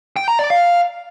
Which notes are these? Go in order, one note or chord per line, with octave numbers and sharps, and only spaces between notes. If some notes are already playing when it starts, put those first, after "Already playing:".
G5
A#5
D5
F5